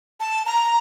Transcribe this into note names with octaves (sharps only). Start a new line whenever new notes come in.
A5
A#5